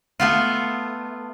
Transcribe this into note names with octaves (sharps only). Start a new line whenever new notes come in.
A3 B3 F4